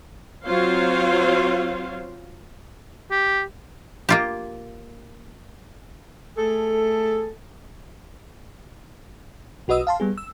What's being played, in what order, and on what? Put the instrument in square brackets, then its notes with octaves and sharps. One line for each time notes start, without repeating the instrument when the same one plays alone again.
[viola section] F#3 C4 F4 C5 C#5 F5
[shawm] G4
[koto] A#3 F4 G4
[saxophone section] A3 G#4 A4
[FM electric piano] B1 F#4 B4 D#5 D#6 E6
F5 A5 C6
G3 B3 G#4
E6